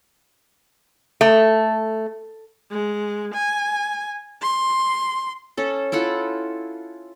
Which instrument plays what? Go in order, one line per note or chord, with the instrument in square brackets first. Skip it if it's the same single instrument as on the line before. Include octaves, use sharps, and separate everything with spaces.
[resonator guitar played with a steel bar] A3
[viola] G#3
G#5
C6
[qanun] C#4 A4
E4 F4 A4 F#5